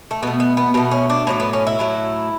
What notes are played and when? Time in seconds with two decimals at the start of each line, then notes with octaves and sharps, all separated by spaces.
0.11 A3
0.23 B2 A3 B3
0.40 B3
0.57 B3
0.74 B2 A3 B3
0.91 C#4
1.10 D4
1.27 A2 F#3 A3 C#4
1.40 B3
1.53 C#4
1.67 E4
1.79 A2 F#3 A3